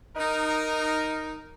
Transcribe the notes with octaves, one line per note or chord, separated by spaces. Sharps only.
D#4 A#4